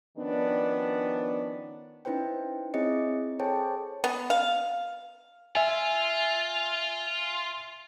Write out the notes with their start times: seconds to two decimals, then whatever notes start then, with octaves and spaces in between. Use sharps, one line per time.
0.18 D#3 F3 B3 C#4 D4
2.05 C#4 D#4 E4 B4 C5 G5
2.74 C4 E4 G#4 C#5 D#5 C#7
3.39 G#4 A4 C5 C#5 G5 A5
4.04 B3
4.30 F5
5.55 F4 E5 G#5